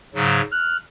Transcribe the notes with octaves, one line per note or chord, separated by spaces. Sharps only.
G#2 C#3 F#3
F6 F#6